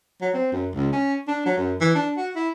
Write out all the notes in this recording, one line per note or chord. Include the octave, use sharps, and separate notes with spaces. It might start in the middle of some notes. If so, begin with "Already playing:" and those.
F#3
C4
F#2
C#2
C#4
D4
F#3
F#2
E3
D4
F#4
E4